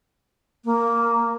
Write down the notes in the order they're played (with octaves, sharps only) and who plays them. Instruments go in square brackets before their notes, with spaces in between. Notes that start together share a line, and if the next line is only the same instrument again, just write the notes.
[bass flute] A#3